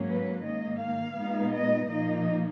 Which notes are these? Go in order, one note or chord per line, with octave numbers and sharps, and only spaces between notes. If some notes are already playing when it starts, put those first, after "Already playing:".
Already playing: G#2 F#3 A#3 C#4
B4
G#2 D#3 A#3 D#5
F5
A#2 G#3 B3 D#4
D#5
A#2 F3 A#3 D#4 D#5